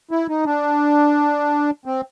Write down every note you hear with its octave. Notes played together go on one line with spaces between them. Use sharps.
E4
D#4
D4
C4